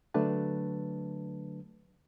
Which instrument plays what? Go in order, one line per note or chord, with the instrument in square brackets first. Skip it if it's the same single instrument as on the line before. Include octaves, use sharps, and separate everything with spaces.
[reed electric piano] D3 F#3 A3 D4 B4 A5